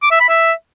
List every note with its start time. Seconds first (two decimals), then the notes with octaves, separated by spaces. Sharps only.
0.03 D6
0.12 E5
0.20 B5
0.29 E5